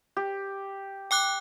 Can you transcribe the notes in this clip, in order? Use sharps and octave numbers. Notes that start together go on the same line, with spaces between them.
G4
G5 D6 F#6